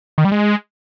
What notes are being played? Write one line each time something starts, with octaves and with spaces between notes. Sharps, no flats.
D#3
G3
G#3